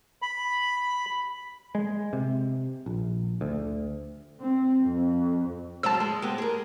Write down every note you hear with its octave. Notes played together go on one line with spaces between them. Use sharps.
B5
G#3
C3
A#1
D2
C4
F2
F#3 G#3 C5 A5 E6
G#3
G#3 B3 G4
G#4 A#4